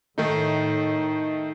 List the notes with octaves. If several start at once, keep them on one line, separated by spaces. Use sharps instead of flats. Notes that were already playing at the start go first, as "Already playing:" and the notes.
A2 D#3 A3 D#4